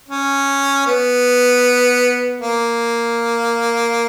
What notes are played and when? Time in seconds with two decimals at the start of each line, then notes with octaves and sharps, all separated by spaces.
0.09 C#4
0.87 B3
2.41 A#3